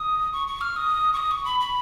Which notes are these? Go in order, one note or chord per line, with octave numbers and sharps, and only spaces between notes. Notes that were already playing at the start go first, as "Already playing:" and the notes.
Already playing: D#6
C#6
C#6
F6
D#6
C#6
D#6
C#6
B5
B5